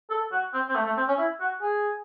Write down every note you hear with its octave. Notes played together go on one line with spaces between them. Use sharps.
A4
F#4
C4
C4
A3
A3
C4
C#4
E4
F#4
G#4